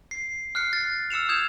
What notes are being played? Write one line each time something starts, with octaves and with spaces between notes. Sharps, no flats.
C7
F6 F#6 C7 C#7
A6
E6 F6 C#7 E7 F7
D#6 G6 G#6 E7 F7